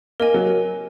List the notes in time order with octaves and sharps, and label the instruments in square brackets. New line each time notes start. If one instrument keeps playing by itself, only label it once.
[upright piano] A#3 [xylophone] A#4 D#5 G#5
[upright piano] F#3